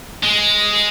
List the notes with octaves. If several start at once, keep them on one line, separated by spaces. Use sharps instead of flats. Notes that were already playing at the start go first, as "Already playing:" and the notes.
G#3